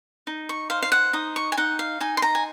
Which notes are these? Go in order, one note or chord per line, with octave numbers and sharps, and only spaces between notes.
D#4
C#6
C5 F5
F5
F#5
D#4 D#6
C#6
G#5
D#4 F#5
F5
D#4 G#5
C6
A#5
G#5